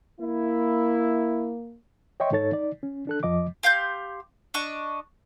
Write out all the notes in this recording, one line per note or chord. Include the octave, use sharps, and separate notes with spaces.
A#3 E4
C#5 D#5 E5 G5 C6 C#6
G#2 D#4 A4 C#5 A6
D#4 D5
C#4
D4 A4 F#6
F2 F3 D#5 D6
G4 F5 C6 G6
D4 D#5 C#6